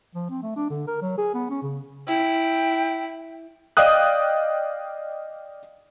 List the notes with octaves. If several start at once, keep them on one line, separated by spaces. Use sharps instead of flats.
F3
C4
A3
D4
D3
A#4
F#3
G#4
B3
C#4
C#3
E4 G5
D5 D#5 F5 G5 D#6 F#6